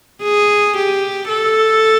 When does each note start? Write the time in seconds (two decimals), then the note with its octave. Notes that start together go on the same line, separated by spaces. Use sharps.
0.23 G#4
0.76 G4
1.28 A4